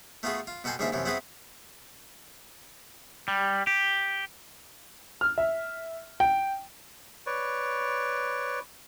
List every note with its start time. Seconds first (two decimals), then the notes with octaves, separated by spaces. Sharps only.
0.23 A3 B3 F4 F#4 G#4
0.47 F4
0.64 B2 F#4 A4 G5 G#5 C6
0.79 A1 G#2 D3 A#3 F4 E5
0.92 F#2 C3 E3 F3
1.05 B3 C4 E4 F#4 G#4 B4
3.28 G3
3.67 G4
5.21 F6
5.38 E5
6.20 G5
7.26 B4 C#5 D5